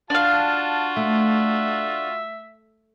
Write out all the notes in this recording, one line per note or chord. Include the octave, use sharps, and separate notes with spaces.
D4 F4 F#4 F5 A5
A3 E5